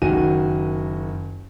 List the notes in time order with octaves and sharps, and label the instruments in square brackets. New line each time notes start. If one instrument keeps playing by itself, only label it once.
[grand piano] F#1 D#3 F#4 G#5 D#7